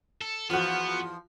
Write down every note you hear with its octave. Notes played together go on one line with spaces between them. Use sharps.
A4
E2 F3 B3 F4 F#4